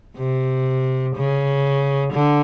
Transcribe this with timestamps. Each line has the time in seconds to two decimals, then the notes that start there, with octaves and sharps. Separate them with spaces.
0.18 C3
1.16 C#3
2.13 D3